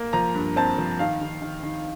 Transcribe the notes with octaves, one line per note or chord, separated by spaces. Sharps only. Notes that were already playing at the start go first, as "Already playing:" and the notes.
Already playing: A#3
F3 A#5
G2
C4 A5
F3
D#3 F5
D#3
D#3
D#3